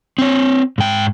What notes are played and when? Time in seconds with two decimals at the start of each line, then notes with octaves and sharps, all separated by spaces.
0.18 C4 C#5
0.78 G#2 G5